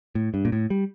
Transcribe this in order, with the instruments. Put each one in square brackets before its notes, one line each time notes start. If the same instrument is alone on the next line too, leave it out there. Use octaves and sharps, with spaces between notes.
[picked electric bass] A2
G2
A#2
A2
G3